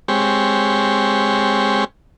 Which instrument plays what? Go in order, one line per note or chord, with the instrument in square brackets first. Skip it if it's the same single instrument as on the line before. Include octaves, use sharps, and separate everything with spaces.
[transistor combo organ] G#3 C4 G4 C#5